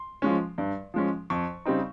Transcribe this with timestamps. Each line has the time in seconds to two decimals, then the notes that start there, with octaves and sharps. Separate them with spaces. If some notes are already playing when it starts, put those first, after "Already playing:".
Already playing: C6
0.22 F3 G#3 C#4
0.58 G2
0.94 F3 G#3 C#4
1.30 F2 C#6
1.65 C#3 G3 C4 D#4